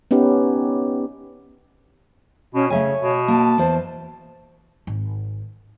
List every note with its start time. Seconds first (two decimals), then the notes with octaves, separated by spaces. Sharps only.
0.11 B3 C#4 D#4 G4 B4
2.54 B2 C#4
2.70 C#3 A3 C#5 E5 G#5
3.01 B2
3.28 A#3 A5
3.58 E2 C5
4.87 G#1